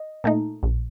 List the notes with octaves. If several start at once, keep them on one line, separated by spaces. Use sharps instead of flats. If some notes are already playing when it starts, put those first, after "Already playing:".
Already playing: D#5
A#2 A3 D#4
A#1